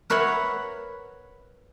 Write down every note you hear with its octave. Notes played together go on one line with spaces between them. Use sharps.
A#4 B4 C#5 E5 F#5 B5